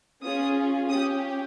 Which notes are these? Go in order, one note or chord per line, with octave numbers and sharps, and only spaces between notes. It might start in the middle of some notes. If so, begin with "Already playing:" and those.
C#4 F4 G#4 D#6
C#4 G4 D#6